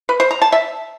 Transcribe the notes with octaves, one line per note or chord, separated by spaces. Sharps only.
B4
C5
A#5
A5
E5